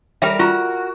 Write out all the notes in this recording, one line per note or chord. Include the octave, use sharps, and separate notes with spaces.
G3 A#4 E5 G5
F4 F#4 A#5